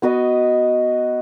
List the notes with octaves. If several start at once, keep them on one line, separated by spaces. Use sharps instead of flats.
B3 F#4 B4 D#5